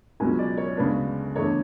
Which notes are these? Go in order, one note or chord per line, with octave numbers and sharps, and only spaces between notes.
C#2 B2 F#3 C#4 G#5
D5
C#5
D2 C#3 G#3 B3 D4 B4
E2 D3 A3 C#5